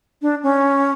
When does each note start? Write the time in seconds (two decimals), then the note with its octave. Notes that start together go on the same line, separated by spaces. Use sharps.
0.22 D4
0.43 C#4